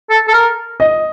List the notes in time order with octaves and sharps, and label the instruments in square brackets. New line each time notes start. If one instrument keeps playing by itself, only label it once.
[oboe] A4
A4
A#4
[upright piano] D#5